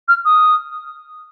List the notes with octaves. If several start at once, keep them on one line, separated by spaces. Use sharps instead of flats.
F6
D#6